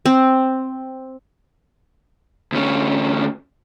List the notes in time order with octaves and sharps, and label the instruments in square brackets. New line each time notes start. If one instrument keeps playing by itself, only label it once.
[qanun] C4
[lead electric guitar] D2 C#4